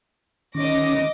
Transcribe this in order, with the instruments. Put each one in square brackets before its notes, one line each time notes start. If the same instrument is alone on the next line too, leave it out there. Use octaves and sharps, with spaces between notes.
[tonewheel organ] D#3 C#4 [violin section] D#5 D6 A#6